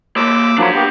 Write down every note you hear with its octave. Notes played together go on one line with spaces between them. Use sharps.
A#3 C#5 D6 E6
F3 F#3 A#3 D4 B5
A#3 B3 G4